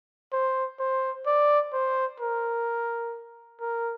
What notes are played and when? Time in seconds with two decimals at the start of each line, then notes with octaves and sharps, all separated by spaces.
0.32 C5
0.80 C5
1.27 D5
1.73 C5
2.20 A#4
3.61 A#4